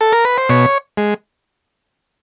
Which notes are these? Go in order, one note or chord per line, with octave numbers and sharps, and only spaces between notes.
A4
A#4
B4
C5
B2 C#5
G#3